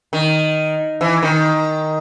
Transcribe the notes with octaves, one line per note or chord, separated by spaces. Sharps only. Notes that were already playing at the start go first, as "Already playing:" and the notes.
D#3
E3
D#3